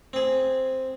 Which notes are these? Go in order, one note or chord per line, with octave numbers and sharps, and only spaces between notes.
C4 G#4